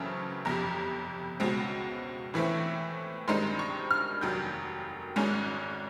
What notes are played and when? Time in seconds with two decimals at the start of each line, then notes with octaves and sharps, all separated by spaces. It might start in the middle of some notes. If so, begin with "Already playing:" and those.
Already playing: F#2 C#3 E3 A3 C4 A5
0.45 G1 F2 C3 A#5
1.40 C#2 B2 G#3 C4
2.34 A2 E3 A3 C4
3.28 G2 D#3 G#3 C4 D#4 C6
3.59 C#6
3.91 F6
4.21 F1 D#2 D#3 F#3 G6
5.16 G#1 G#2 D#3 G#3 C#4